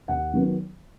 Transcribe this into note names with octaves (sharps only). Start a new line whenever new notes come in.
D#2 F#5
D#3 F#3 B3